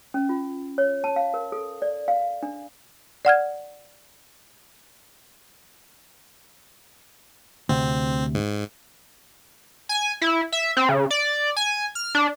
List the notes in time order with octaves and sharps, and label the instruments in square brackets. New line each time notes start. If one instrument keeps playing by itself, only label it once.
[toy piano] C#4
F4
C#5
A5
F5
A#4
A4
D5
F5
D4
[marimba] D5 F#5 F6 G#6
[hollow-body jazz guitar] D2 C3 [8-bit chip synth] C4
[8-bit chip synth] G#2
[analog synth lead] G#5
E4
E5
C4
C#3
D5
G#5
F6
D4